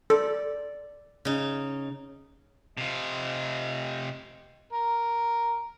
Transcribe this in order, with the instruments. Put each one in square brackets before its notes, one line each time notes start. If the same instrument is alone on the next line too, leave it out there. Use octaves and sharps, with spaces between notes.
[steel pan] A4 [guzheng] D5
[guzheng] C#3 D#4
[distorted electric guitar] C3 F4 [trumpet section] D#5
[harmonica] A#4